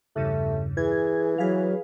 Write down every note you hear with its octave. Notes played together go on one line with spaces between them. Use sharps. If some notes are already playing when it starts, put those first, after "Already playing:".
E2 G2 C#3 A3
E3 G#4 G#6
F#3 G#4 B4 F5